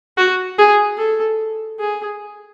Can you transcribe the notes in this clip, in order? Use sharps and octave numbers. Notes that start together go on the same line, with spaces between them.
F#4
G#4
A4
G#4